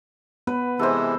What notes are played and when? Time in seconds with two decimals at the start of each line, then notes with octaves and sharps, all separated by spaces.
0.47 B3 B4
0.79 C3 E3 G#3 A4 C5